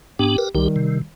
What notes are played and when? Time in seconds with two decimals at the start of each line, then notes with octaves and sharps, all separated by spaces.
0.19 G#2 B3 D4 G4
0.38 A#4 B4
0.55 C2 D#3 G3 G4
0.76 C3